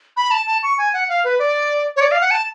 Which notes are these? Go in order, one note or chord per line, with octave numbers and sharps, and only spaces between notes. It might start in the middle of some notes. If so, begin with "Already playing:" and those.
B5
A5
A5
C#6
G#5
F#5
F5
B4
D5
C#5
D5
F5
F#5
A5